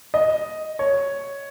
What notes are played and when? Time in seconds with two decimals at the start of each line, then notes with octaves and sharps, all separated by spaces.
0.14 D#5
0.79 C#5